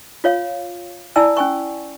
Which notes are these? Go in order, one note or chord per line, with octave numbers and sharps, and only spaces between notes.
F4 C#5 F5
E4 D5 G#5 A5 E6
C#4 G#5 C#6